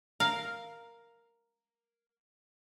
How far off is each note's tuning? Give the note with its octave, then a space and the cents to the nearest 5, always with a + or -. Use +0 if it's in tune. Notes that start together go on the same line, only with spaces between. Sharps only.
A#4 +0 F5 +0